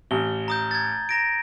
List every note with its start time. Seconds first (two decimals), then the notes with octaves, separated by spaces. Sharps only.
0.11 A1 G7
0.48 A#5 D#6 G6
0.71 G#6 A6
1.09 A#5 A#6 D7